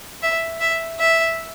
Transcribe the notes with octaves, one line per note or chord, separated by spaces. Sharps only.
E5
E5
E5